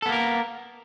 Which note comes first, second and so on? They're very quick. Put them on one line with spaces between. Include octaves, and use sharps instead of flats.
A4 B3 A#3 A#4